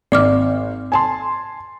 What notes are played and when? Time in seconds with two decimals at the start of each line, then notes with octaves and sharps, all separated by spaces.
0.12 G#1 D5 D6 F6
0.92 G#5 A5 C6